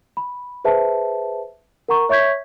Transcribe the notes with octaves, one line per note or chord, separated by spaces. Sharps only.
B5
G#4 B4 C5 E5 A5
A#4 F#5 A#5 C#6
C#5 E5 C#6 G6 G#6 B6